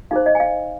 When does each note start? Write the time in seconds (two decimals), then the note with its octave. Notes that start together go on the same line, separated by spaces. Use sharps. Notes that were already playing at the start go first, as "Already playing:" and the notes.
0.11 D#4 G#4 C5 F5
0.26 D#5
0.35 G#5
0.40 F5